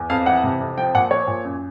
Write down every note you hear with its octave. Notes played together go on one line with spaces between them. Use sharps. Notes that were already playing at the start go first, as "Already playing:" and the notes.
Already playing: E2
F2 F5
E3 F#5
C3
F2
F3 G5
A#2 F#5
F3 C#5
A#2
F#2